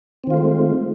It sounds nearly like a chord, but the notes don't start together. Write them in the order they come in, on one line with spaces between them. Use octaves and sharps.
C4 D#3 F4 A3 G#3